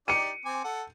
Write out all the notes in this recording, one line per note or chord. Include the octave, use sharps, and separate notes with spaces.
D#4 G4 D5 C#7 D#7
C4 G#5 D6
A4 F#5